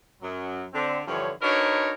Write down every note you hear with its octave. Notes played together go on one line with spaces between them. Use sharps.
F#2 F#3
D3 C4
G2 D3 E3 F3 C#5
D4 D#4 F#4 A#4 B4 C#5